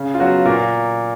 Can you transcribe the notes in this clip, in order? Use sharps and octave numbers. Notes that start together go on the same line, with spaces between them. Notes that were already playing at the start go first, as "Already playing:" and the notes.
Already playing: C#3
F4
F#3 B3 F#4
A#2 A#4